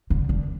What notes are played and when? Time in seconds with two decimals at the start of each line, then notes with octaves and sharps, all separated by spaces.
0.10 D3
0.29 D3